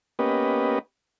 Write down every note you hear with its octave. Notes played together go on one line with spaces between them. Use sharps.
A#3 B3 C#4 G4 B4 D#5